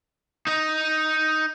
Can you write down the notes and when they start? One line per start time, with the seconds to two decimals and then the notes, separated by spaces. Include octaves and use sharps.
0.47 D#4 D#5